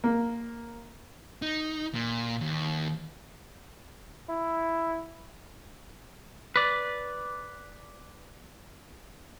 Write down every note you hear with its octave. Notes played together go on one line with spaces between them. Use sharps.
A#3
D#4
A#2
D#2
E4
B4 D5